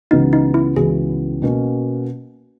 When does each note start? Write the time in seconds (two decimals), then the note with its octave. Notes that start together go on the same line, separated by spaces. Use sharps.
0.11 C#2 C#3 E3 B3 D#4 F#4
0.33 D#4
0.54 E4
0.76 C#2 C#3 E3 B3 F#4 G#4
1.42 B2 A#3 C#4 F#4